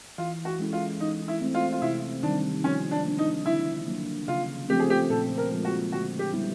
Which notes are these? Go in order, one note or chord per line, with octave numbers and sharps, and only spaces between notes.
E3 F4
F#4
G#3 C#4 E4 A4
F4
E3 D#4
E4
A3 C4
F4
F4
C3 E4
D#3 G3 D4
F3 C#4
D4
A#3 D4
D#4
D3 E4
F#3 A#3
C#3 F4
F3 A3 C4 G4
G#4
G4
A#2 A4
A#4
F3 G#3 C4
F#4
D3 F#4
G4
G3 B3 E4 G4